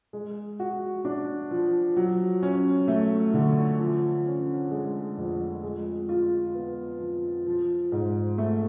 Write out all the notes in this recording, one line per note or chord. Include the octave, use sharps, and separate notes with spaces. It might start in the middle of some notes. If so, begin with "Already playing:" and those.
G#3
F#4
D4
F3
F#3
C#4
A3
D3
F3
C#4
G#3
F2
G#3
F4
B3
F3
F3
G#2
A3